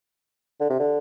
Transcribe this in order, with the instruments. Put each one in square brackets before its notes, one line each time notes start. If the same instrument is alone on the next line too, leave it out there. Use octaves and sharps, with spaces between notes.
[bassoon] D3
C3
D3